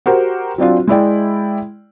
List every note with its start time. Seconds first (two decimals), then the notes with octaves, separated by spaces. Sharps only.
0.06 F#4 G4 A#4 C5
0.58 F#3 C4 D4 F4
0.88 G#3 E4 D5 G5